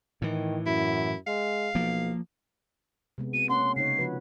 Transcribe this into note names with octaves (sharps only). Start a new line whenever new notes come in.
A2 D#3 E3
F#2 E4
G#3 F5
B1 F3 A#3
C3 G#3 B3
B3 F#4 D#7
A#3 C#4 F#5 C6
C#3 D#4 C#5 C7
F3 F#4 B4